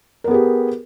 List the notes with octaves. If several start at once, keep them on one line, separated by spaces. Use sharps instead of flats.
B3 G4 G#4 A#4